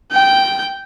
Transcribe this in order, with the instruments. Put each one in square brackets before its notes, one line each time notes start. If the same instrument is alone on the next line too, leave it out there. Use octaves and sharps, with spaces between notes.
[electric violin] G5 G6